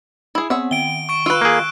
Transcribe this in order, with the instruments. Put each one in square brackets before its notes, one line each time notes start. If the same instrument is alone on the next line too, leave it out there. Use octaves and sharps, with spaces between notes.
[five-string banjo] E4 G#4 [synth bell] B5
[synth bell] B3 C4 [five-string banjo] G#4 E5 F#5
[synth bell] D#3 G5 [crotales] D7 G7
[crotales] C#6 D7
[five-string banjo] F4 B4 [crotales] E6 F#6
[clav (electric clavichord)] A#3 G#4